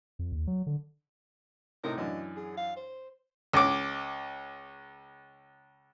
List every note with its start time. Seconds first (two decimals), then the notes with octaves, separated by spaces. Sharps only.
0.19 F2
0.32 D#2
0.47 F#3
0.67 D3
1.84 A2 C3 D#4 A#4
1.97 F#2 E3 D4 D#5
2.37 G#4
2.57 F5
2.76 C5
3.54 C#2 D6